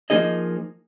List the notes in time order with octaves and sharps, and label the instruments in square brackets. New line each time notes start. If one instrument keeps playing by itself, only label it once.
[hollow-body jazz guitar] F3 A#3 D#4 G#4 D#5